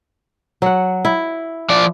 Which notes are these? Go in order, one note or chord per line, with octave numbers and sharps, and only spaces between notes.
F#3 F#5
E4
F3 D5